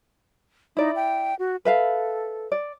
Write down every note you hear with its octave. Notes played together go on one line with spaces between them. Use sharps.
D#4 E4 D5
G5
F#4
A4 B4 E5 F5
D5